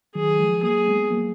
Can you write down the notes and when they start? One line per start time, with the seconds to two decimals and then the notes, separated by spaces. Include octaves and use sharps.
0.15 D#3 F#3 G#4
0.39 F3 G#3
0.62 F#3 A#3 G#4
0.87 G#3 B3
1.11 F#3 A#3